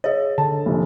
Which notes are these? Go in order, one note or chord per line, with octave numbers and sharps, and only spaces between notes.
G#4 C#5 D#5
D3 A5
F1 A#1